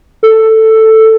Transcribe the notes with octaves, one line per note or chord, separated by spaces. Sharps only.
A4